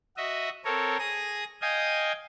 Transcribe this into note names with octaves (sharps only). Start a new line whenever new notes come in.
F#4 D#5 E5
C4 A4 A#4 C#5
G#4 D#6 A#6
D#5 F5 G5 G#5 D#6